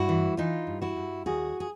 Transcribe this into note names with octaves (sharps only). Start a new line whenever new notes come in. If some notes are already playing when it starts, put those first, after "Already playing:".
Already playing: G2 E4 F#4
E3
E3 D#4 F4
G2
E4 F#4
G2
D#2 F#4 G#4
G#4